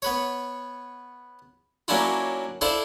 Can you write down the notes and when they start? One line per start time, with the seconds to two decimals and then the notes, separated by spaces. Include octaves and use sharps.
0.02 B3 B4 C#5
1.88 F#3 A#3 C#4 D4 E4 F4
2.61 D4 E4 A4 C5 D5 F5